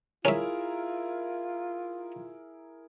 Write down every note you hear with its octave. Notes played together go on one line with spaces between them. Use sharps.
C#4 E4 F4 G#4 A#4 E5